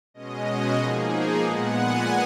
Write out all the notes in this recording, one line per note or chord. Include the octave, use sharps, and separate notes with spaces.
B2 G#3 C#4 D#5
F#4
F3 A#3 D#4 G#4
A#2 G#3 B3 F#5
G#5